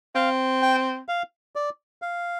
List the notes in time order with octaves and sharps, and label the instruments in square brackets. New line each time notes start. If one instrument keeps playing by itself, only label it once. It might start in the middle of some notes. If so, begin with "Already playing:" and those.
[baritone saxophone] C4 [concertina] F5
[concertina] G5
F5
D5
F5